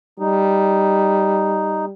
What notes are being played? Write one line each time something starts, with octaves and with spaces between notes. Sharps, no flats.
G3 D#4